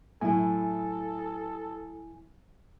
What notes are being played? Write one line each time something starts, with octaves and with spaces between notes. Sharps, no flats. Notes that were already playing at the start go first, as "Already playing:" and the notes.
A2 F#3 E4 A4 E5 G#5